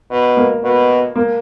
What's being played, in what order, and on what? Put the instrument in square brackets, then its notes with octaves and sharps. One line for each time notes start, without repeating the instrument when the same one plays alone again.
[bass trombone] B2
[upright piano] A#3
[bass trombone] B2
[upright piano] A#3